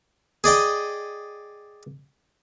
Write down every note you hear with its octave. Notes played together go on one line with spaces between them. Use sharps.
G#4 D5 D#5 G5